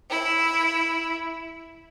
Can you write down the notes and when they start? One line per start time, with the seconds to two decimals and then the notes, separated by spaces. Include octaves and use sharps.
0.11 E4